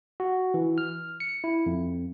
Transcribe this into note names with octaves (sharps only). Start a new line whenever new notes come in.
F#4
E3
F6
C#7
E4
F2